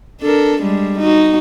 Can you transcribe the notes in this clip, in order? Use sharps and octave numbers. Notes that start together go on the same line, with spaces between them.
D4 A4 A#4
G3 G#3 D4
D#4 F#4